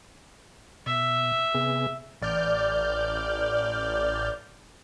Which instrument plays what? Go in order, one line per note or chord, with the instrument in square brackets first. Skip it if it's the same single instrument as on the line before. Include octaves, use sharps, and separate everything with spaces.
[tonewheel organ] B2 [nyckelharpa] E5
[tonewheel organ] C3 B3 G#4
[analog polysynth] A1 D5 F6 G6